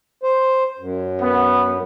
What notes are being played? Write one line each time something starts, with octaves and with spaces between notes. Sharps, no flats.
C5
F#2
B3